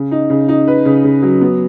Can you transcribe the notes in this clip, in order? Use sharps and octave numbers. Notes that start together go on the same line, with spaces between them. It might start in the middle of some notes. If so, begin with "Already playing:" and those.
Already playing: C#3
D#4
C#3
D#4
B4
C#3
C#3
F#3
B3